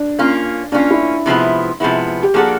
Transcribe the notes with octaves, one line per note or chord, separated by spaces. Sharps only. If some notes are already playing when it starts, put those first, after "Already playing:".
Already playing: D4
A#3 C#4 F4
A#3 C#4 D4 F4
E4
C3 F3 G#3 B3 E4
C3 F3 G#3 B3 E4
G4
F3 A#3 D4 F#4 G#4 A4